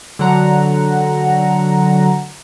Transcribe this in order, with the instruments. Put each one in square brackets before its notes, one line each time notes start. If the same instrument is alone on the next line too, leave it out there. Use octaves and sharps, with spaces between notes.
[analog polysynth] D3 F#3 F#5 A#5